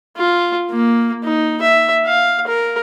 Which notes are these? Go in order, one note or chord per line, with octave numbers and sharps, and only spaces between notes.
F4
A#3
D#4
E5
F5
A#4